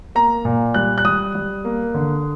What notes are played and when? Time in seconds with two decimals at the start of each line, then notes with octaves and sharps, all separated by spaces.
0.15 A#3 A#5
0.45 A#2
0.74 G3 F#6
0.98 F#6
1.05 G3 D#6
1.35 G3
1.65 A#3
1.94 D3